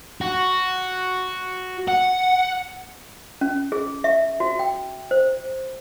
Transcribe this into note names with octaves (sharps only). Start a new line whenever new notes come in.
F#4
F#5
C#4
G#4
E5
F#4
G5
C5